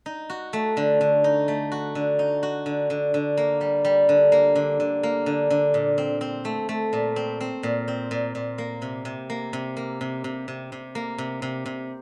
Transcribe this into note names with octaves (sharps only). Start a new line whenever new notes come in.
D#4
F#4
A3
D3
D3
D#4
A3
F#4
D3
D#4
F#4
D3
D3
D3
A#3
G3
G3
D3
A#3
D3
D3
A#3
D3
D3
A#2
C4
C4
A3
A3
A#2
C4
C4
A#2
C4
A#2
A#2
A#3
C3
C3
A#3
C3
A#3
C3
C3
C3
C3
A#3
C3
C3
C3